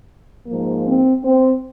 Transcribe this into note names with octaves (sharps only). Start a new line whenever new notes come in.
G#2 F3 A#3
C4
C4